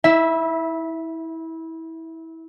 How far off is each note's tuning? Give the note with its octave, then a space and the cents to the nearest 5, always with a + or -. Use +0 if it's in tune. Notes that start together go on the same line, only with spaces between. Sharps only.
E4 -25 E5 +0